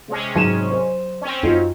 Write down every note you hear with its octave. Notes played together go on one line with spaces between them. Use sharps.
C3 G#3 C#4
G#2 F#3 D#7 E7
C5
C4 C#4
F#2 D#4 F4 F#4